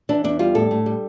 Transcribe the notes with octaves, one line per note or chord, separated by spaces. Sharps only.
E3 D4
E2 D4
G3 F4
A2 A4
A2
G3